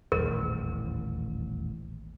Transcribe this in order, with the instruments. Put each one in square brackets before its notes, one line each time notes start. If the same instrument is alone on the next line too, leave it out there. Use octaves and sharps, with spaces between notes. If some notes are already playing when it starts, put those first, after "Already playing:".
[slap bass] D#1 A1 E2 [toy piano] A#4